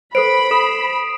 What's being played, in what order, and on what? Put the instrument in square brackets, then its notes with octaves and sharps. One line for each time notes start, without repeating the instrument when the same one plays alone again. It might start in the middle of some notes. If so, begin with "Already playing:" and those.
[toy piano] A4 B4 C5 [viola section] B5 [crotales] C7 D7
[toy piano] A4 [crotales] D#6 E7